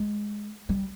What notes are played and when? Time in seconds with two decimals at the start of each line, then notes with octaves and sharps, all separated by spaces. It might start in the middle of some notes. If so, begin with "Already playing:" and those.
Already playing: G#3
0.69 G3